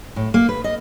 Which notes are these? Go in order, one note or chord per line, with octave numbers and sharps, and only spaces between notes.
A2
A#3
B4
D#5